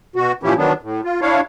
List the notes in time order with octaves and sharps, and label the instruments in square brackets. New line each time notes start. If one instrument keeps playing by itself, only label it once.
[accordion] B2 F#4
A#2 E3 F3 C#4 E4 G4
D#3 F#3 B3 D4
A2
F4
D4 E4 C#5 F5